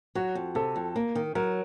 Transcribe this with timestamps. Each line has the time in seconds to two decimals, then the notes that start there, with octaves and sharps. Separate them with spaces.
0.15 F#3 F#4
0.35 F2
0.55 C3 A4
0.76 F2
0.96 A#3
1.15 D#3
1.35 F#3 A#4